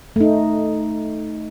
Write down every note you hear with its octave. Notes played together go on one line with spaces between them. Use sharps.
A3 D#4